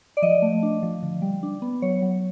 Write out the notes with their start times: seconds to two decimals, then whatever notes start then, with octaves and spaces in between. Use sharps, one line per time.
0.17 D5
0.22 F3 D#5
0.42 A3
0.63 D4
0.83 F3
1.03 D3
1.22 G3
1.43 D4
1.62 B3
1.82 F#3 C#5
2.02 F#3